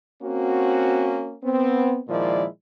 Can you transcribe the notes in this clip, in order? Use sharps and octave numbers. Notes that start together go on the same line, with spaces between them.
A#3 C4 C#4 F#4
B3 C4
A#2 D#3 F3 G#3 E4 D5